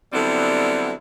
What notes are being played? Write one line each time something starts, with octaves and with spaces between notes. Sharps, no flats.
D3 F#3 G3 B3 C4 E4